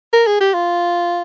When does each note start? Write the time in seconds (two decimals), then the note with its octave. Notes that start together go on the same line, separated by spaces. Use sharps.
0.13 A#4
0.27 G#4
0.41 G4
0.54 F4